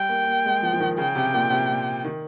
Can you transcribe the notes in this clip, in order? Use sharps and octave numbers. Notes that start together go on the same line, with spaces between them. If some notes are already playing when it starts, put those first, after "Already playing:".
Already playing: G3 G5
A#3
A#3
G#3
F3
F3
D#3
C#3 G5
C3
A#2
C3
A#2
D#3